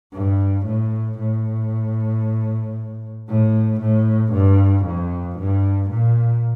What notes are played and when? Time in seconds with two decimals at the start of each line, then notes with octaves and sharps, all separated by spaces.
0.13 G2
0.66 A2
1.18 A2
3.28 A2
3.80 A2
4.32 G2
4.85 F2
5.38 G2
5.90 A#2